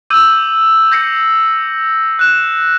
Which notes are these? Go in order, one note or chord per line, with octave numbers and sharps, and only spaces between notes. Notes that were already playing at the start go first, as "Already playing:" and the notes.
D6 E6 G6 D#7 F#7
G6 A#6 C7 C#7
F#6 E7